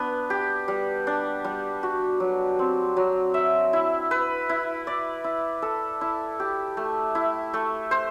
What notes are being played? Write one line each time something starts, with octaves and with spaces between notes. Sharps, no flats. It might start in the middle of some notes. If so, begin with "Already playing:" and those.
Already playing: B3 D4
G4
G3
D4
G3
F#4
F#3
C4
F#3
E5
E4
B4
E4
D5
E4
A4
E4
G4
A3
E4
A3
C5